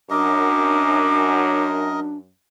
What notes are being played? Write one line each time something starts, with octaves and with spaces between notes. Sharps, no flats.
F#2 D4 A#4 D#5 D6